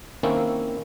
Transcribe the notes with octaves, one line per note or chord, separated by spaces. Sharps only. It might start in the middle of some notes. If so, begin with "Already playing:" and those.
D#3 A#3 C4 C#4 E4